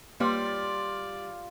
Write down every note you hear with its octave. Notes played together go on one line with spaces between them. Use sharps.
G3 A#3 F4 B4 C#5 D5